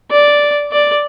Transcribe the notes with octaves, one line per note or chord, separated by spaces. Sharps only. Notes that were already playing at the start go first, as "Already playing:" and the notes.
D5
D5